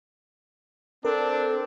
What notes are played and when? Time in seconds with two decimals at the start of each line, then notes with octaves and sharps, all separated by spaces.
1.05 C4 D4 A4 A#4